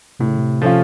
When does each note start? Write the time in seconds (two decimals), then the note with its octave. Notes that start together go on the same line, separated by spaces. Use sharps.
0.19 A2 C3
0.29 C#3
0.38 C3
0.62 F3 A3 C#4 F4